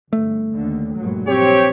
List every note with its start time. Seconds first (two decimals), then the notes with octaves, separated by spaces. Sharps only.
0.13 G1 A3
0.51 D#2 D3
0.97 A#1 G2 F#3
1.27 A#1 C4 G4 C#5